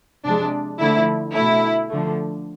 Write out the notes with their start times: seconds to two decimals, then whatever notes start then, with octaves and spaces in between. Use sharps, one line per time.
0.24 C3 F3 G#3 D4
0.80 D3 F3 A3 E4
1.34 B2 A3 E4
1.89 D3 F3 A3